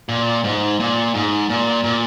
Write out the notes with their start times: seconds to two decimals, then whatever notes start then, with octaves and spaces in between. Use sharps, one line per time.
0.09 A#2
0.44 G#2
0.80 A#2
1.14 G#2
1.50 A#2
1.84 A#2